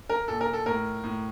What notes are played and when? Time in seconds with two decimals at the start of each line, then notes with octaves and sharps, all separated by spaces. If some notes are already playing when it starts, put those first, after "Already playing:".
0.10 A#4
0.28 A#2 A4
0.41 A#4
0.53 A4
0.66 A2 A#4
1.04 A2